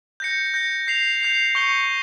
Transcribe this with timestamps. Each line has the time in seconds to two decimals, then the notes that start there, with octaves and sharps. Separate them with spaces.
0.20 G6 A#6 C#7
0.54 G6 A#6 C#7
0.87 G6 C7 F7
1.21 G6 C7 F7
1.55 C#6 G6 C#7 G7